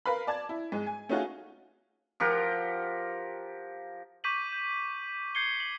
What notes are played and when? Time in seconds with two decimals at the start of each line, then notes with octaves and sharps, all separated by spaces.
0.06 A#4 B4 F5 B5
0.27 D5 A5 G#6
0.49 E4
0.72 G#2 G#3
0.86 G#5
1.09 A3 C#4 D#4 F4 F#4 G#4
2.20 F3 G4 A#4 F#5
4.24 C#6 D6 G6 B6 D#7 F#7
4.52 G6
5.35 G6 G#6 C7 C#7 G7
5.60 F#7